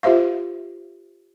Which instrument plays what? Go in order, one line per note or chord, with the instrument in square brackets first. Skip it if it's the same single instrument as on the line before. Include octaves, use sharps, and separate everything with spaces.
[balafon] F4 G4 C5 E5 F5